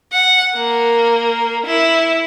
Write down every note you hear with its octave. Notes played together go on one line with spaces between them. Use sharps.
F#5
A#3
E4